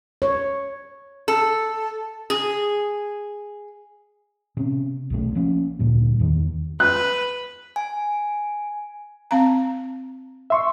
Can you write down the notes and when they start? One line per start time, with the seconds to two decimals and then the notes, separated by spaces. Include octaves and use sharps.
0.22 C#5
1.28 A4
2.30 G#4
4.57 C3 B3 C#4
5.10 B1 B2 A3
5.35 F3 A#3 C#4
5.79 D2 A#2 G3
6.20 E2 D#3
6.80 B4 F#6
7.76 G#5
9.31 C4 F5 A#5
10.50 E5 C6 C#6